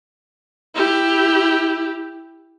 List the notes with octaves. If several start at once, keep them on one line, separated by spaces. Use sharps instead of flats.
E4 G4